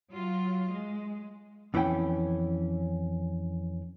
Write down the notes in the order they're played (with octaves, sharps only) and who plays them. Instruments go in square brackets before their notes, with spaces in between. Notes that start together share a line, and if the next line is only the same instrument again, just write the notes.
[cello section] F#3 F4
G#3
[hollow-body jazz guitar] F2 E3 B3 C#4 G5